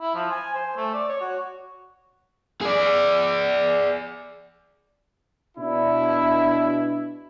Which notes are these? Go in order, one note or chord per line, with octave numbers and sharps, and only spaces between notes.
E4
F3
G#5
C5
A3
D5
C#5
F#4
G#4 D5
B2 D4 E4